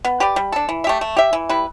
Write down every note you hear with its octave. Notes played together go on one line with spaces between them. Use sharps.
B3
G4 B4 D5
G3
D4 A4
E3
E5
A3 G4
A3
G4 E5
E3
G3 E4 B4